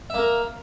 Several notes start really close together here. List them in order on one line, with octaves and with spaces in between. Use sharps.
E5 A#3 A#4